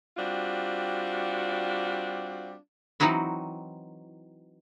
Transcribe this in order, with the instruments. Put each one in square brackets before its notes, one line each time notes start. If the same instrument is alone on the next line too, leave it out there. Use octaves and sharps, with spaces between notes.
[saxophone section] G3 C4 D4 F4 F#4
[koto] E3 F#3 C4 D#4 E4 F#4